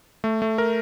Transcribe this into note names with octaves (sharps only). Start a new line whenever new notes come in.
A3
A3
A#4